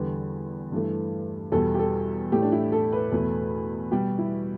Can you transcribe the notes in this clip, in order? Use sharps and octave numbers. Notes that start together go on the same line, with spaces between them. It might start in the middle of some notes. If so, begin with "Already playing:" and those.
Already playing: E2 D3 G3 B4
G2 E3 A3
E2 B2 G3 A4
G4
A4
A2 A3 G4
D4
E4
A4
B4
E2 B2 A3
B2 G3 G4
E4